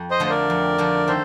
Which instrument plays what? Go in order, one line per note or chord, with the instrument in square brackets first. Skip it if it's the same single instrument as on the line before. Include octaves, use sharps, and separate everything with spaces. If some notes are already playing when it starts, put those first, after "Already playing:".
Already playing: [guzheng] F2
[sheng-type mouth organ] C5 D#5
[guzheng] D3 F3 A3
[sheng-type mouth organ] C5
A#4 D5
[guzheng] F2
D3 F3 A3
[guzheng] D#3 [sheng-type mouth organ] A4 C5